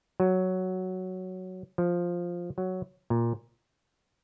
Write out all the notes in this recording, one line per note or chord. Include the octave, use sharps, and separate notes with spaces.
F#3
F3
F#3
A#2